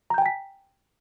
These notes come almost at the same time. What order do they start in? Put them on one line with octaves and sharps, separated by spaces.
A#5 G6 G5 G#5 B6